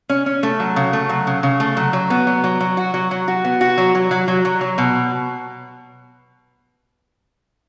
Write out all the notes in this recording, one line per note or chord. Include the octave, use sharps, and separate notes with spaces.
C#4
C#4
A3
F#3
C#3
A3
F#3
C#3
C#3
A3
F#3
F#3
B3
F#3
F#3
F#3
F#4
F#3
F#3
F#4
B3
F#4
F#3
F#3
F#3
F#3
F#3
F#3
B2